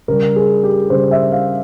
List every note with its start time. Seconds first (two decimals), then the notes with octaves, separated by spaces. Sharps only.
0.08 C#3 G3 A#4
0.36 G#4
0.63 G4
0.90 C#3 G3 C5
1.11 E5
1.32 F5